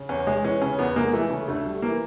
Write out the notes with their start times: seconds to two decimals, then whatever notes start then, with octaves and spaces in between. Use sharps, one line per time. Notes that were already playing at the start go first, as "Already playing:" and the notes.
Already playing: C#3
0.09 E2 C#4
0.27 G#3
0.44 E3 C#4
0.61 C#3 C#4
0.79 E2 B3
0.96 G#3 A#3
1.13 E3 A3
1.30 C#3
1.48 D2 A3
1.65 G3
1.82 E3 A#3